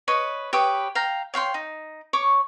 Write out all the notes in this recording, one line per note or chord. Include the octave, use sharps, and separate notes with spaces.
B4 C#5 D#5
G4 B4 C#5 D#6
F5 G5 A#5
C#5 F5 G5 C6
D#4
C#5 C#6 D6